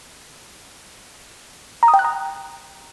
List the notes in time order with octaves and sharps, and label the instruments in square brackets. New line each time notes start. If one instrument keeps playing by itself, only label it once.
[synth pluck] A#5
D#6
G5
F#6
A#5